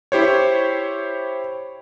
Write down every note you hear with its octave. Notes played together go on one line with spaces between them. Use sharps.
E4 G4 C5 C#5